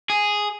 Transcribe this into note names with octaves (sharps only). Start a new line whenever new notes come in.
G#4